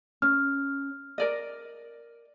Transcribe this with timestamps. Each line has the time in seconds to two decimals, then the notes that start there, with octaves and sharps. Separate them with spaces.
0.22 C#4 F6
1.18 A#4 D5 D#5